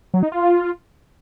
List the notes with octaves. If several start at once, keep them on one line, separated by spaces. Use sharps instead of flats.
F#3
D#4
F4